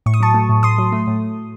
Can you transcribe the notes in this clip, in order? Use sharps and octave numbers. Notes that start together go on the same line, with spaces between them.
A2 C#6
D#6
F#3 A5 C#6
A3
A2
A2 C6 D#6
F#3
A3
A2